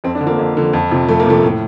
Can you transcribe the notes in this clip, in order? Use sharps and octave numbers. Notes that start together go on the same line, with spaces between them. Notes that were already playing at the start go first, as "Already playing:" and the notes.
F2 C4
D4
D3
F3 A#3
F2
D3 F3
F2
C3 F3
F2 A3
A#3
C3 F3 A3
A2